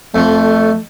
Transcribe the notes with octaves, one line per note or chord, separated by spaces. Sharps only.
F2 F3 A3